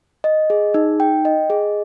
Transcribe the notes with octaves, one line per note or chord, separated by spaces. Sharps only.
D#5
G#4
D#4
G5
D#5
G#4